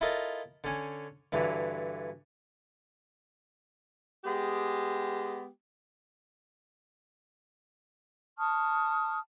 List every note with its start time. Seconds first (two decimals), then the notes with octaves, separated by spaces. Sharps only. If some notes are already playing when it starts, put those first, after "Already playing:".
0.01 E4 F4 A4 A#4 D#5
0.64 D3 C#4 G#5
1.32 G2 D3 E3 F#3
4.25 G#3 B3 G4
8.39 A5 C#6 D#6 F6